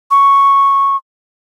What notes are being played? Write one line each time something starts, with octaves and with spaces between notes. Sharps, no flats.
C#6